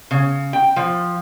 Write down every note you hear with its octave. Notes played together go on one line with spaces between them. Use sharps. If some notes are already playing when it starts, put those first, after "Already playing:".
C#3
G5
F3